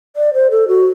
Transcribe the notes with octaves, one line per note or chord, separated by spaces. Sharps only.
D5
C5
A4
F#4